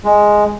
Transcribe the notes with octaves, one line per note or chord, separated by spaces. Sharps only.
G#3